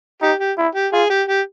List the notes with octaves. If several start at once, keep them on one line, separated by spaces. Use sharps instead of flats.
D#4 G4
G4
E4
G4
F4 G#4
G4
G4